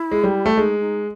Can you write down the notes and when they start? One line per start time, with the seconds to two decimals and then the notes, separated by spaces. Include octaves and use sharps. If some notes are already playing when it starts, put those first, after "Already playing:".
Already playing: E4
0.11 G#3
0.23 G3
0.46 A3
0.57 G#3 D#4
0.80 D#4